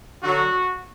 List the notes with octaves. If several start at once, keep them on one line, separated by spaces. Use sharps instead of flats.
D3 F#3 F#4